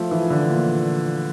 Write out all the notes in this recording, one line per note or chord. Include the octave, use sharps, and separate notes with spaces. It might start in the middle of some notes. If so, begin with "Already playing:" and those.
Already playing: F3 A3
E3
D3
A#2